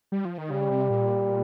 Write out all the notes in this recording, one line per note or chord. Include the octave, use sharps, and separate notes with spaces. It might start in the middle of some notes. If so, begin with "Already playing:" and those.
G3
F3
D#3
C#3 G3
C3
A#2